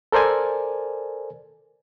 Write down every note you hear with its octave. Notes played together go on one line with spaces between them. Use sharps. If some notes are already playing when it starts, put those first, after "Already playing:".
A4 A#4 C5 D5 G#5